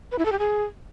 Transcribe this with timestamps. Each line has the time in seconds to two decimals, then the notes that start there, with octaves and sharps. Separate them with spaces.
0.12 B4
0.19 E4
0.25 A4
0.32 G4
0.39 G#4